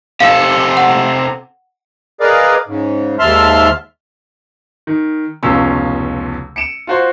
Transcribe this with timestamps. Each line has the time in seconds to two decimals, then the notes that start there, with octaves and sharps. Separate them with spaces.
0.20 C3 A4 F5
0.77 F#5
2.20 G#4 A#4 B4 D5 D#5 F5
2.67 G#2 C#3
3.19 D#2 G#2 E5 A5 C6 F6
4.87 D#3
5.43 F1 C#2 B2 C#4 F4 E6
6.56 C#7 D7 E7
6.87 F4 F#4 C5